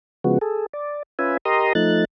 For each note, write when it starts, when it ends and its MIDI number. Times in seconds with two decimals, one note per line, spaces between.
0.24 0.38 49
0.24 0.38 53
0.24 0.38 56
0.24 0.38 59
0.24 0.38 66
0.41 0.66 68
0.41 0.66 69
0.73 1.03 74
1.19 1.37 61
1.19 1.37 65
1.19 1.37 71
1.19 1.37 76
1.19 1.37 80
1.45 1.73 67
1.45 1.73 70
1.45 1.73 75
1.45 1.73 82
1.45 1.73 84
1.45 1.73 87
1.75 2.05 53
1.75 2.05 57
1.75 2.05 63
1.75 2.05 90
1.75 2.05 93